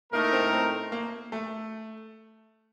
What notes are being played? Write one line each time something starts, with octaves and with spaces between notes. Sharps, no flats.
A2 A3 A#3 D#4 A#4
C4
C4
A#3
A3